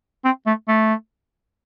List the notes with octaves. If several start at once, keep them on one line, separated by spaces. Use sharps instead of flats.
C4
A3
A3